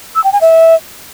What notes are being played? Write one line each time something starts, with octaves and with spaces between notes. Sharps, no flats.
E6
G5
G#5
E5